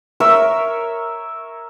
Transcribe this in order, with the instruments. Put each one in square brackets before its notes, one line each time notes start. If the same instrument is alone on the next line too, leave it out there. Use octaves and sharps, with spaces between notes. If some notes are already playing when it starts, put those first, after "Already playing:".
[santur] A#4 C#5 E5 E6